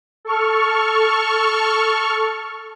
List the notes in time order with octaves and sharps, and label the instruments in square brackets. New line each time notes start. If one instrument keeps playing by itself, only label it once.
[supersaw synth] A4 C#6 F6